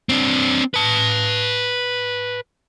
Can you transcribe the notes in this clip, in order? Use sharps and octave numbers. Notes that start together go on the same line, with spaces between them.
C4 D4
B4 A5